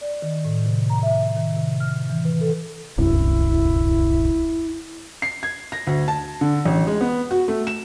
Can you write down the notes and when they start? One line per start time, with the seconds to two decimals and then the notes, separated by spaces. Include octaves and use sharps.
0.01 D5
0.22 D#3
0.45 A2
0.66 C3
0.90 A#5
1.03 E5
1.37 D#3
1.57 C3
1.80 F6
2.10 E3
2.25 B4
2.41 A4
2.98 D1 C2 F#2 E4
5.22 C7
5.43 G#6
5.72 A#6
5.87 D2
6.08 A5
6.41 D3
6.66 A1
6.87 G#3
7.01 B3
7.31 F#4
7.48 A3
7.67 E7